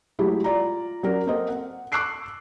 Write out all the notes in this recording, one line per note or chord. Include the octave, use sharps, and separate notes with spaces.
F#3 G#3 A3 E4 G4
F4 D5 A#5
F#3 C#4 F#4 A#4 D5
A#3 C4 A4 A#4 C5 D#5
F#5
C#6 D6 E6 F#6 C7 D7